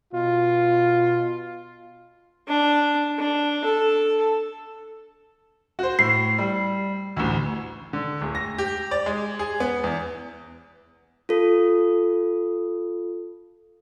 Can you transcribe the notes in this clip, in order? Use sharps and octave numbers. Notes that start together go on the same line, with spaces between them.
B2 F4
D4
D4
A4
F#4 C5
A2 C7
G3
A1 D2
D3
D1
A#6
G4
D5
G#3
G#4
B3
E2
F4 A4